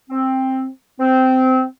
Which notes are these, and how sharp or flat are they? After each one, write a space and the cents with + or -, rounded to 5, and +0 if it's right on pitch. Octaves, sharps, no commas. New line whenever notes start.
C4 +10
C4 -15